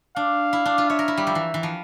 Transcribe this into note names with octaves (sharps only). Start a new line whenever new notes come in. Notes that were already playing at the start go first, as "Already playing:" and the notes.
D4 F5
E4
D4
F4
C#5 E5
A#4
E4
G3
F3
E3
E3
F3